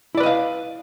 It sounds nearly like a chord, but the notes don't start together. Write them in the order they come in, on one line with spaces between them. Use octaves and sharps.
E4 D5 B4 D#5 F5